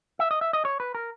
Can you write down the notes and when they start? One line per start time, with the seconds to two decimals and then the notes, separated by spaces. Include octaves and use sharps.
0.19 E5
0.31 D#5
0.41 E5
0.53 D#5
0.65 C#5
0.80 B4
0.95 A#4